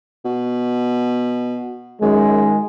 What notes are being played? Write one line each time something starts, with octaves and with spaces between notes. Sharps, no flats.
B2
F#2 D#3 G#3